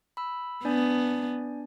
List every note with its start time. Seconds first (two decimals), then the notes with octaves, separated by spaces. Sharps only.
0.17 B5 E6
0.65 B3 D4 D5 G#5